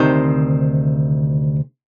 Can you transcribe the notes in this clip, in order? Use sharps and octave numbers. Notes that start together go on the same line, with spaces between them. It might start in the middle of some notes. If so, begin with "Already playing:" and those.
Already playing: D2 C3 D#3 C5